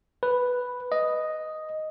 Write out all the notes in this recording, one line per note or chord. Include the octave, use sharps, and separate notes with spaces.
B4
D#5